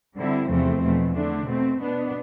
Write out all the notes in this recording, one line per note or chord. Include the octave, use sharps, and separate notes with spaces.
D3 G3 C4 E4
E2 C3 F3 A3 C4
E2 B2 A3
D3 A3 D4
B2 A3 C4
B2 B3 D4